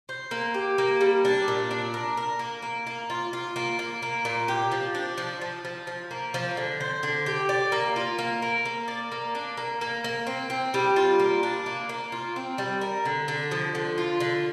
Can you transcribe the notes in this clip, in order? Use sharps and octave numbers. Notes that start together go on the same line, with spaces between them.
C5
A#3
G4
A#3
G3
D4
A#2
D4
A#4
A#4
A#3
A#3
A#3
F4
F4
A#3
A#3
A#3
A#2
G4
F3
D4
F3
F3
F3
F3
A#3
F3
D3
C5
D3
G4
D5
A#3
F4
A#3
A#4
A#3
D5
A#3
D4
A#3
A#3
A#3
C4
C4
G3
F4
A#3
D4
A#3
A#3
F4
C4
G3
A#4
D3
D3
F3
D3
F4
D3